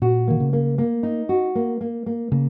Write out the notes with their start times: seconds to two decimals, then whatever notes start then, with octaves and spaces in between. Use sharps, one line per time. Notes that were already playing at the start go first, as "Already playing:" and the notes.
0.02 A#2 F#4
0.27 D#3 A#3
0.40 C#3
0.53 A#3
0.78 A#3
1.03 D#4
1.29 F#4
1.55 A#3
1.81 A#3
2.06 A#3
2.32 C#3 A#3